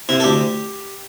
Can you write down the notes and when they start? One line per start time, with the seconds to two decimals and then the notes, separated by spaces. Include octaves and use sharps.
0.09 C3 E4
0.20 A4
0.24 D2 G4